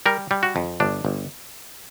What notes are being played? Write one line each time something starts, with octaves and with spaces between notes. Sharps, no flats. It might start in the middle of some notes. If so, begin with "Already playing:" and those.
G3 A#4
G3
F#4
F2
G1 D4
G1